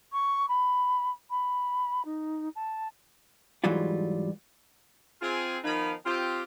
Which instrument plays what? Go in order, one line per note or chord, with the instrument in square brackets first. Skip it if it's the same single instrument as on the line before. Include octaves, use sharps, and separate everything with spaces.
[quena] C#6
B5
B5
D#4
A5
[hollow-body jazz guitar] G#2 E3 F#3 G3 F4
[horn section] C4 F4 G#4
D#3 F3 B3 D#4 F5 B5
C4 F4 G4